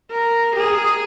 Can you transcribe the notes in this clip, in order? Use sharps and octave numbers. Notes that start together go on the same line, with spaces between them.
A#4
G#4